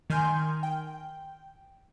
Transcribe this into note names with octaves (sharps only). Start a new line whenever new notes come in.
D#3 G#5 C6 F6 G6
G5